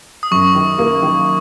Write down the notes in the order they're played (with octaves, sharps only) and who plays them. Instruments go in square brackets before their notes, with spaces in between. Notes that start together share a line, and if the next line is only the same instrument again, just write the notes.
[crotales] D#6
[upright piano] F#2 [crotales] C#6
[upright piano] D#3
A#3
D#3